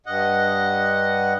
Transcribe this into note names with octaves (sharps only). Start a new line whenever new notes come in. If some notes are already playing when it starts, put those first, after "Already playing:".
G2 D#5 F#5